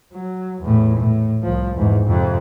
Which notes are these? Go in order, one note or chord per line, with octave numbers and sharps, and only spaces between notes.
F#3
E2 A2
A2
C2 F3
E2 G#2
F2 C3